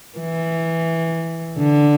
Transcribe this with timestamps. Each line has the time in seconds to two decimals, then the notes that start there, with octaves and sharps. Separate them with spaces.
0.19 E3
1.58 D3